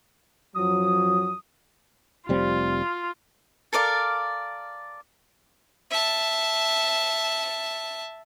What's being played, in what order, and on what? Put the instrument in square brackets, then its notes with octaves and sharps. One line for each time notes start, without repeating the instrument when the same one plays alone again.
[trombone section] F#2 F3 F#3 [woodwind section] D#6
[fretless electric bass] F1 G3 C4 [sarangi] F4
[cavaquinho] A4 A#4 D5 F5
[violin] E5 A5